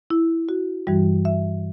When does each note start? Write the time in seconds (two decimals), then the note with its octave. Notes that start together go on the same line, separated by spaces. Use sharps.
0.10 E4
0.49 F#4
0.87 G2 E3 G3 F#4
1.25 E5